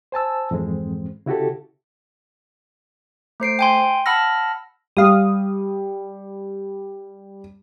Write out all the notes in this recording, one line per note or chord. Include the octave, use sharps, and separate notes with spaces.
C5 G#5 A5 E6
F2 G#2 E3 G#3 C4
C#3 E4 F#4 G4 A4
A3 C5 C7 D7
G5 G#5 C6
F#5 A5 B5 E6 F6 A#6
G3 F5 D#6